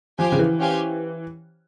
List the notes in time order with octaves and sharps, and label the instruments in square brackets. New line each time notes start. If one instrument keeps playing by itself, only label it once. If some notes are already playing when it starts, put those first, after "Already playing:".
[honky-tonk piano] F3 [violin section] G4 C5 F5 G#5
[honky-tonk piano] C#3
E3
[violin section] C#4 G4 C5 F5 G#5